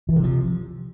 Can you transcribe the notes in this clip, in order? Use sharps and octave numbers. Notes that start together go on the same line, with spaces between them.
E3
C3
F3